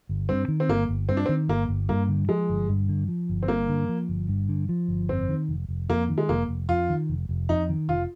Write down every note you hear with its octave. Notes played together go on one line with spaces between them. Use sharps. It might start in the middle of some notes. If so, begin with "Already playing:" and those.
G1
G2 C4
D#3
C4
G1 A#3
G1
G2 C4
D4
C4
D#3
G1 A#3
G1
G2 A#3
D3
F3 G#3
G1
G2
D3
F3
G1
C4
G2 A#3
D3
F3
G1
G2
D3
F3
G1
F2 C4
D#3
F1
F1
F2 A#3
D#3
G#3
F1 A#3
F1
F2 F4
D#3
F1
F1
F2 D#4
D#3
F1 F4